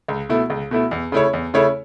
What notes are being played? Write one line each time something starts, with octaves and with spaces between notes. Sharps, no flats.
C#2
B2 A3 E4
C#2
B2 A3 E4
E2
C#3 A3 E4 C#5
E2
C#3 A3 E4 C#5